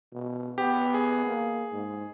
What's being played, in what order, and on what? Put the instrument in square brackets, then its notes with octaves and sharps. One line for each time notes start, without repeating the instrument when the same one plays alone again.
[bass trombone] B2
[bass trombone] B3 [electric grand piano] G4
[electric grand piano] G#4
[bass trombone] A#3
G#2